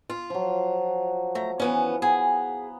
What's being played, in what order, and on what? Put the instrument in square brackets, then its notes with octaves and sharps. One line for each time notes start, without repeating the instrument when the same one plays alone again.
[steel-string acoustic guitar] F4
[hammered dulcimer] F3 F#3
[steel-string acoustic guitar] A3 A#5
E3 B3 C#4
[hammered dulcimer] B3 [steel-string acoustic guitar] G#4